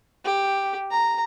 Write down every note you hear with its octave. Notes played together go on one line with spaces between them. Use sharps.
G4
A#5